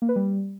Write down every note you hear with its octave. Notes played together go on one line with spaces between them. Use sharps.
A#3
B4
G3